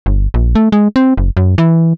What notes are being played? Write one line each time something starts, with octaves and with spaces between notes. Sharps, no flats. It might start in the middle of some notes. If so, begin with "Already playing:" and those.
G1
A#1
A3
G#3
C4
F#1
F#2
E3